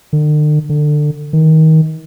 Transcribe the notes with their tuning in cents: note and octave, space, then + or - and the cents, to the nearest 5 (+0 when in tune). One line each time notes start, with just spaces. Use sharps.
D3 +45
D3 +20
D#3 +25